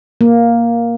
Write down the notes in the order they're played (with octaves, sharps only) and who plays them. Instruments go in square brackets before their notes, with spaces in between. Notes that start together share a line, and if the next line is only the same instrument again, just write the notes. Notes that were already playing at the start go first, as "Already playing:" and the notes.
[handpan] A#3